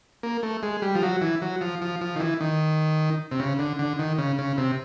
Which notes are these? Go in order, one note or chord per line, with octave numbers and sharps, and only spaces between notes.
A#3
A3
G#3
G3
F3
F#3
E3
F#3
F3
F3
F3
D#3
E3
D#3
C3
C#3
D3
D3
D#3
C#3
C#3
C3